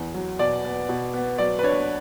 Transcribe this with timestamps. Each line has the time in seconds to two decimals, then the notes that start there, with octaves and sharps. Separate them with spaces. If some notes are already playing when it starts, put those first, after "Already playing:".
Already playing: E2
0.14 F#3
0.39 B2 D5
0.65 B3
0.89 B2
1.14 B3
1.38 F#3 D5
1.59 B4
1.63 D4 C#5